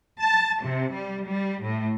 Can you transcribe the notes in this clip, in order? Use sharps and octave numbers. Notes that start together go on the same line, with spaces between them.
A5
C3
G3
G3
A2